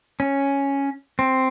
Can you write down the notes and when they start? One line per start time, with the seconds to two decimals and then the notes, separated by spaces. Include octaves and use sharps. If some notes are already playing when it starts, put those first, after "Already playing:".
0.20 C#4
1.19 C4